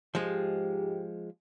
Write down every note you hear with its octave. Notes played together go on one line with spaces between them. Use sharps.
G#2 F3 G#3 G4